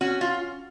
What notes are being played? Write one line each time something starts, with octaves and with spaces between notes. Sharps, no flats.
C#4 F#4
F4